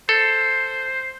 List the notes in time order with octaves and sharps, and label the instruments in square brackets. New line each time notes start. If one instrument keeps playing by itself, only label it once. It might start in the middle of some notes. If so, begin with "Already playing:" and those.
[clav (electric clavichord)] A4 [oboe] C5